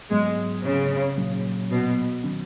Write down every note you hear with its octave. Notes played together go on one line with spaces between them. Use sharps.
G#2 F#3 G#3 B3
C#3
A#2 F#3 C#4
B2
D#3 F#3 C#4